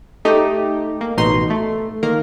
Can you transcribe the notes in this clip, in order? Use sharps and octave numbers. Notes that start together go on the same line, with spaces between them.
A3 D#4 G4
A#3
A1 B2 D#4 C6
A3
D#3 A#3 A#4